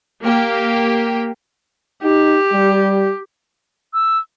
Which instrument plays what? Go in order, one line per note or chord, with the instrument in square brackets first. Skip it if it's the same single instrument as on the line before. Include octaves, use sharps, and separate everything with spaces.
[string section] A#3 G4
[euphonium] D#4 [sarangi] G4
[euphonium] G3
[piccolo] E6